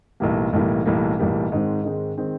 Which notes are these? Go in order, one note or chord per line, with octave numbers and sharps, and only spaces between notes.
B1 A2 E3 G3 A#3
B1 A2 E3 G3 A#3
B1 A2 E3 G3 A#3
B1 A2 E3 G3 A#3
G#2 D#3 G#3 C4
G#2 D#3 G#3 C4
D#3 G#3 C4